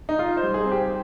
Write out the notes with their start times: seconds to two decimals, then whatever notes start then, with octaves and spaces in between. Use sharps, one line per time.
0.09 D#4
0.19 D#4 F4
0.37 C5
0.43 G3
0.54 G#4
0.66 C4
0.72 G4